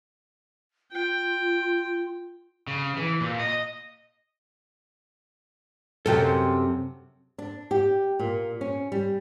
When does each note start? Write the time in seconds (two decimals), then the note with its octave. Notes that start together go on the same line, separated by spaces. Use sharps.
0.92 F4 G5
2.67 C#3
2.96 E3
3.20 A#2
3.39 D#5
6.06 F#2 C3 A4 A#4 G5
7.38 D4
7.71 G4
8.19 A#2
8.61 C#4
8.92 G3